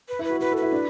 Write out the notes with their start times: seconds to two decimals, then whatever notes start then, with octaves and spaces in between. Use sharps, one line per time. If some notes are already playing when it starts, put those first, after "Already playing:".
0.09 B4
0.19 E4
0.24 B4
0.30 F#4
0.40 F#4 B4
0.52 A4
0.57 B4
0.62 E4
0.72 D4